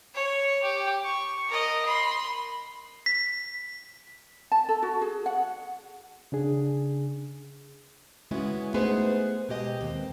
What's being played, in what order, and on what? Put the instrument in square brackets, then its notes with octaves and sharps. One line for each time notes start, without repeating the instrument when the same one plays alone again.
[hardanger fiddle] C#5
G4
C#6
A#4 D#5
B5 C6
[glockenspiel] B6
[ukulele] A5
A4
F#4
G#4
F#5
[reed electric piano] C#3 D4 G#4
[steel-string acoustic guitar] C#3 G#3 B3 C#4 E4 F#4
A3 B3 D#4 G#4 B4 C5
B2 G#3 G4 D#5
D#2 C4